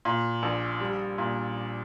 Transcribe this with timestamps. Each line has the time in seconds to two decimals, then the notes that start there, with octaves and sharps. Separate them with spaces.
0.05 A#2
0.43 A#1
0.81 G3
1.18 A#2